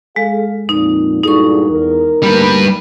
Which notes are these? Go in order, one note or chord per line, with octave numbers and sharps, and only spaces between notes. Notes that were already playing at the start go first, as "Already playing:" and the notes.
G#3 G#4 A4 F5
F2 A#2 D#4
G2 A#2 D#4 E4 F#4 G#4 A4 C#6
E2 A#4
D2 G3 A#3 B4